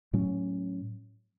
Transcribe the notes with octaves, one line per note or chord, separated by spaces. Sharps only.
A2 F#3 C#4